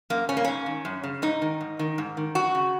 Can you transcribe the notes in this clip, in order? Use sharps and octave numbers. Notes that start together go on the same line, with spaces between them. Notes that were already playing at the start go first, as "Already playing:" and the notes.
F#2 A#3
C#3 C#4
A#3
G#2 C#4
D#3
F#2
C#3
G#2 D#4
D#3
G#2
D#3
G#2
D#3
F#2 F#4
C#3